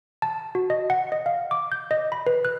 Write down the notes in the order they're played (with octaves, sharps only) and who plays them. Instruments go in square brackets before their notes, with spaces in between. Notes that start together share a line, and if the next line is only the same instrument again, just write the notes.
[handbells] A5
F#4
D#5
F#5
D#5
F5
D6
G6
D#5
B5
B4
F#6